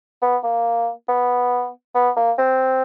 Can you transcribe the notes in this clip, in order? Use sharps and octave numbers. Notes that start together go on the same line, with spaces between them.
B3
A#3
B3
B3
A#3
C4